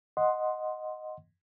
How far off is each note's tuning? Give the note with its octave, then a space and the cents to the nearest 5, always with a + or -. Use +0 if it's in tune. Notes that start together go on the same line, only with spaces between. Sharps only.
D#5 +0 F#5 -5 C6 +0